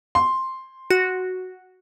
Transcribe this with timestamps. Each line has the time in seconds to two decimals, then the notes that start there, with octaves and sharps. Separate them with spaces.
0.15 C6
0.90 F#4